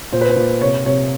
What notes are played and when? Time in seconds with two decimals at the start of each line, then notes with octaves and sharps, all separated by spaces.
0.12 A#2 C5
0.21 B4
0.30 C5
0.36 A#2
0.61 C3 C#5
0.85 C3 C#5